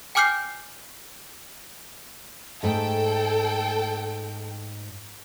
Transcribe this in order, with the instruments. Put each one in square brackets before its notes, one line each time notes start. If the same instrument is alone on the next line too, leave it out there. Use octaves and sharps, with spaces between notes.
[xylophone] G5 G#5 D6 F6 G6 C7
[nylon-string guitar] G#2 A3 [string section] A4 G5